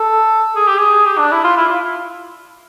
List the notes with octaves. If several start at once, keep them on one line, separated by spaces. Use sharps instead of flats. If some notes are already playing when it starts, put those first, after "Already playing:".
Already playing: A4
G#4
G4
G#4
G4
D4
E4
F4
E4
F4